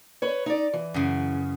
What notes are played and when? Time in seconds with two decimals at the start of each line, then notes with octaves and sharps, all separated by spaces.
0.22 B4 C#5
0.46 D#4 D5
0.73 E3
0.94 F#2 C#3